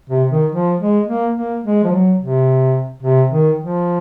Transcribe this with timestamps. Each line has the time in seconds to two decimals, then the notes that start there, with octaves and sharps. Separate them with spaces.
0.10 C3
0.31 D#3
0.52 F3
0.80 G#3
1.07 A#3
1.35 A#3
1.63 G#3
1.84 F3
1.91 F#3
2.20 C3
3.03 C3
3.31 D#3
3.59 F3